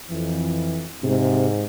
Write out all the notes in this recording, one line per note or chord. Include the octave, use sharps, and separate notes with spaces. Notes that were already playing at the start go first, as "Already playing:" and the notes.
F2 E3
G#2 C3